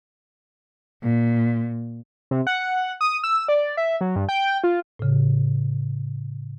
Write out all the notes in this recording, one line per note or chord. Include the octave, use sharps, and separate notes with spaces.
A#2
C3
F#5
D#6
E6
D5
E5
F#3
G2
G5
F4
A2 C#3